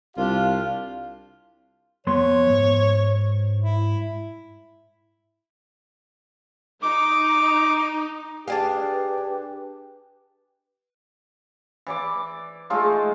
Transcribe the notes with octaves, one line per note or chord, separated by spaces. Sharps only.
C2 D4 F4 G4 F5
F2 B3 C#5 C6
G#2
E4
D#4 D6
D4 G4 G#4 B4 D5 F5 G#5 A5
E3 D5 D6
G#3 A3 D#4 F4